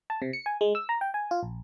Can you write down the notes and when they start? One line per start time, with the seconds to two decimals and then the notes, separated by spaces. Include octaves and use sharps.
0.10 A5
0.22 C3
0.33 C#7
0.46 G#5
0.61 G#3
0.75 E6
0.89 A#5
1.01 G5
1.14 G#5
1.31 F4
1.43 A#1